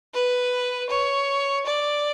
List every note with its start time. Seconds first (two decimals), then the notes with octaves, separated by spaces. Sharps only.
0.14 B4
0.90 C#5
1.66 D5